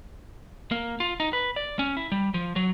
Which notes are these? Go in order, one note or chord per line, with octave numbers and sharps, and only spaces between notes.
A#3
F4
D#4
B4
D5
C#4
E4
G3
F3
F#3